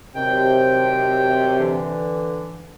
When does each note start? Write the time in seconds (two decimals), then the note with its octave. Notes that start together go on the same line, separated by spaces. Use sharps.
0.16 C3 D#3 F#3 G5
1.60 D3 E3